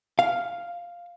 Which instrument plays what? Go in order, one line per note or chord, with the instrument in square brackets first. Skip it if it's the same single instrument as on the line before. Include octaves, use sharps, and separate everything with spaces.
[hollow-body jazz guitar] F5